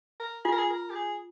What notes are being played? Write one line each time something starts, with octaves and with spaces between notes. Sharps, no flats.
A#4
F4 G#4
A#4
G#4
A#4
G4
G#4